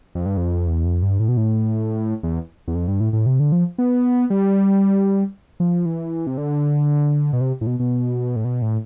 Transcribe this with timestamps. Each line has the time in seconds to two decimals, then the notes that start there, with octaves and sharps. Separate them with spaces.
0.15 F2
0.26 G2
0.37 F2
0.67 E2
0.85 F2
1.02 G2
1.19 A2
1.28 B2
1.37 A2
2.23 E2
2.68 E2
2.75 F2
2.88 G2
3.00 A2
3.13 A2
3.26 C3
3.40 D3
3.52 F3
3.78 B3
4.30 G3
5.60 F3
5.86 E3
6.27 C3
6.38 D3
7.33 B2
7.41 C3
7.61 A2
7.67 B2
7.80 B2
8.36 A2
8.45 B2
8.62 A2